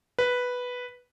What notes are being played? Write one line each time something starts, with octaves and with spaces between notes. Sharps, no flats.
B4